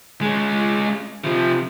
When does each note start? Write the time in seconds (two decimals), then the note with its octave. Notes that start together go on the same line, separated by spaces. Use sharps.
0.21 G#3 C#4
1.24 C3 F3